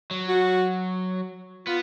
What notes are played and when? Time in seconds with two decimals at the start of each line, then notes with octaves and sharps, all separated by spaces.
0.11 F#3
0.28 F#4
1.67 B3 F4